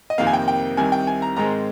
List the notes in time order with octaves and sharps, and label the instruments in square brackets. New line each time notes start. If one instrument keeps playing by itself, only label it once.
[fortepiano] D#5
F2 C3 D#3 A#3 F5
G#5
G5
G5
C2 C3 D#3 G#5
G5
G#5
A#5
G#2 D#3 G#3 C4 A#5